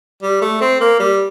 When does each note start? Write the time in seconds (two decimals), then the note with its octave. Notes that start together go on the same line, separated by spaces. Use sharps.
0.23 G3
0.42 A3
0.61 C4
0.81 A#3
1.00 G3